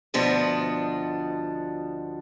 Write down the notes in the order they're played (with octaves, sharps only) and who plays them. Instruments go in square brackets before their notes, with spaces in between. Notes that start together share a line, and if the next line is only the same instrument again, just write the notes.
[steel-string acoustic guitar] D2 B2 F3 B3 D4 D#5